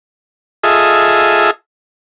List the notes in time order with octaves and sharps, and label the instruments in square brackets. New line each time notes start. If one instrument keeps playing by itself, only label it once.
[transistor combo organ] F4 G#4 A4 D#5 E5